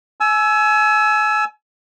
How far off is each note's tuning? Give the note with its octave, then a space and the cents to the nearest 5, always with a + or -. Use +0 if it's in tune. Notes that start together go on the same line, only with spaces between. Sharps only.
G#5 +35 E6 +5